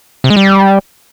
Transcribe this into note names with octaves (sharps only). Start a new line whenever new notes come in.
C3
G#3
G3